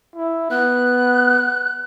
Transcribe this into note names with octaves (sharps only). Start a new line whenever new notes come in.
E4
B3 F#6